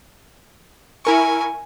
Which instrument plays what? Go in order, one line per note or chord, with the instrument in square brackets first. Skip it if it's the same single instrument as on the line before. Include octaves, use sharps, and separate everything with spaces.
[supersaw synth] E4 A#4 C#6 [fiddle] G#5